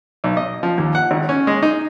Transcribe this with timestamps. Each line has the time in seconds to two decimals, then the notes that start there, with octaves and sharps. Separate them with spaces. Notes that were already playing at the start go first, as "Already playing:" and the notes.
0.24 B1
0.37 D#5
0.63 F3
0.78 D#2
0.95 F#5
1.11 G#1
1.29 C#4
1.47 G#3
1.63 D#4